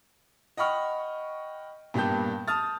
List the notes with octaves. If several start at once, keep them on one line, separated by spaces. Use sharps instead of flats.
D#5 F#5 G5 B5 C#6 F6
G2 A#2 B3 G4 A5 G6
A5 D#6 F6 A6